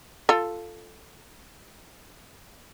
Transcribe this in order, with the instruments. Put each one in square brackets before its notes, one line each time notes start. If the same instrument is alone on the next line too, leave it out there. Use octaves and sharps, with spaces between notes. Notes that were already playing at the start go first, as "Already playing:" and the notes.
[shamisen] F4 A4